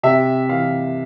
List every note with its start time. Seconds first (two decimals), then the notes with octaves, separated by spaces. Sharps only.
0.03 C3 E5
0.49 E3 F5